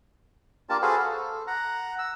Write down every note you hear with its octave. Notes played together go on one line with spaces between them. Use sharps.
A#3 D4 F4 G4 A#4 A5
F#4 G#4 A4 B4 C5 F5
A4
F#5 A#5
E6